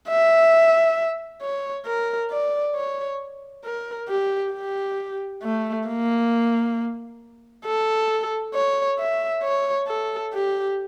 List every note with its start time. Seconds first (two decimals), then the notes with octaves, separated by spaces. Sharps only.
0.08 E5
1.41 C#5
1.86 A#4
2.31 D5
2.75 C#5
3.65 A#4
4.08 G4
4.53 G4
5.43 A3
5.88 A#3
7.65 A4
8.55 C#5
8.99 E5
9.43 C#5
9.88 A4
10.33 G4